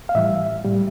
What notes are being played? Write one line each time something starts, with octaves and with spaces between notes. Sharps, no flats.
F5
A2 E3 G3 E5
A2 G3